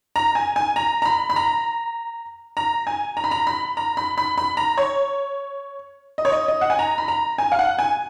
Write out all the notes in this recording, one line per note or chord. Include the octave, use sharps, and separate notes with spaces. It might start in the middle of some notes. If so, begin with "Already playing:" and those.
A#5
G#5
G#5
A#5
A#5
B5
B5
A#5
A#5
G#5
A#5
B5
A#5
B5
A#5
B5
B5
B5
A#5
C#5
D#5
C#5
D#5
D#5
F#5
G#5
A#5
B5
A#5
G#5
F5
F#5
G#5